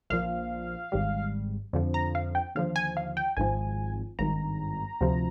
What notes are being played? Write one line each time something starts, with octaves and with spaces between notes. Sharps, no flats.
A#1 A#2 F3 F5
G#1 G#2 G3
F2 D3 F3
A#5
F5
G5
D#2 D3 F3 F5
G#5
F5
G5
G#1 G#2 F3 G#5
G#1 G2 D#3 A#5
D2 C3 F3